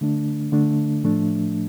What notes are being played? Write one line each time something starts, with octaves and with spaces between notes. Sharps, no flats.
D3 A3 D4
D3 A3 D4
A2 F3 A3 D4